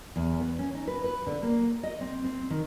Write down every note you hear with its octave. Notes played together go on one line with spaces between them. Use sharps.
E2
B3
C#4
D#4
B4
B4
D3
A#3
D#5
C4
C4
D#3